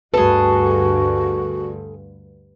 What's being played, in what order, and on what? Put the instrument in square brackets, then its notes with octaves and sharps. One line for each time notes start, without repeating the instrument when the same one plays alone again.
[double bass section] D2 G2 D3 [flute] F#4 [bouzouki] G#4 A4 [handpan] B4